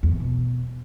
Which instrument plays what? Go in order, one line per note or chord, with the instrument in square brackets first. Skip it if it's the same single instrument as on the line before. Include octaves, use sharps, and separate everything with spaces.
[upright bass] E2
A2
B2